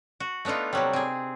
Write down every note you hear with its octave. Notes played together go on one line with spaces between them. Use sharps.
F#4
A3 B3 D4 D#4 F4
C3 F#3 G3
C4 G#4